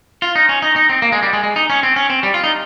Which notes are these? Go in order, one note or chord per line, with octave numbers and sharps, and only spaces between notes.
F4
D#4
C#4
D#4
D#4
C4
A#3
G#3
G3
G#3
G#3
D#4
C#4
C4
C#4
C4
G3
F4
D#4